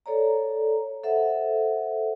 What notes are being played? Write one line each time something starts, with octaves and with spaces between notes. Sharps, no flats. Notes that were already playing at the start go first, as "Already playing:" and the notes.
A4 C#5 D5 A#5
A4 C5 E5 F#5